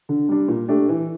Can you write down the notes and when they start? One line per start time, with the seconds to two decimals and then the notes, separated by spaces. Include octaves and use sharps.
0.09 D3
0.29 G3 D4
0.48 A#2
0.68 A3 D4 G4
0.89 E3